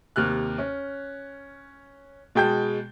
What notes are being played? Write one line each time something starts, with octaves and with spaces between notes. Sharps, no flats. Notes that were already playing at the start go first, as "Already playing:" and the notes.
D#2 C3 F6 F#6
C#4
B2 G#3 G5 A5 G6